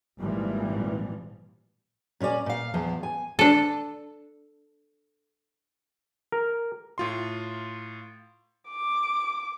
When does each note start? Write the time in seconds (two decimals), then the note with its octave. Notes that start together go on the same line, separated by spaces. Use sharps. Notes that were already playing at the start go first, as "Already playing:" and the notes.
0.20 G#1 A#2 E3 F3 G3
2.20 A#2 C#4 G4 D5 G#5
2.46 A#2 F5
2.74 E2 F3
3.03 G#5
3.39 D4 A4
6.32 A#4
6.98 A2 F4 C6
8.69 D6